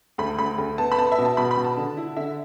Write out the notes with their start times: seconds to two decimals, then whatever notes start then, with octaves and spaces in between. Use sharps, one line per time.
0.18 D2 B5
0.38 D2 B5
0.58 D2
0.78 B3 A5
0.92 B5
0.98 B3 A5
1.12 E5
1.18 B2
1.25 A5
1.37 B2 B5
1.51 B5
1.57 B2
1.64 A5
1.77 D3
1.97 E4
2.17 D3 E5